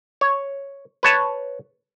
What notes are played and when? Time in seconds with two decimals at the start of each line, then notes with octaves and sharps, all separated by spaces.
0.21 C#5
1.03 B4 C#5 A5